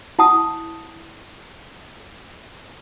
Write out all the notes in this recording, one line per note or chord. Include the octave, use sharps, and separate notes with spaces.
E4 F#5 A5 D#6